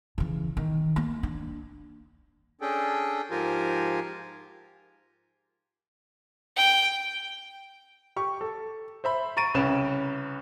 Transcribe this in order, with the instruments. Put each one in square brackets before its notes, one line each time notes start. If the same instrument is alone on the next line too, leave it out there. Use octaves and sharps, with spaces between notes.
[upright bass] C#3 E3
D#3
A#3
D4
[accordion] C#4 D4 G#4 A4 G5
G#2 F3 F4 G4 A#4 G#5
[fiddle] G5
[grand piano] G4 C#6
A4
C5 E5 B5
A#5 C#6 A6 D7 D#7
C2 C#3 C#4 B4 E7